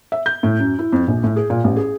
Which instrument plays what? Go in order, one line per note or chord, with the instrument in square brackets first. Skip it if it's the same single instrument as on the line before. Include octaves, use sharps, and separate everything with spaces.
[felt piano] E5
G6
A2
F#2
E4
F2
A#1
A2
G#4
A#2
A1
G#4